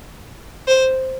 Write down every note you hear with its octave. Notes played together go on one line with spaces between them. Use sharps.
C5